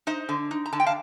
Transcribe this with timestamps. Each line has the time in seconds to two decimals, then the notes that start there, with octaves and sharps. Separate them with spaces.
0.07 D#4 C5 D#5
0.29 D3
0.51 D#4
0.66 A#5
0.73 D3 A5
0.80 G5
0.86 F5 A5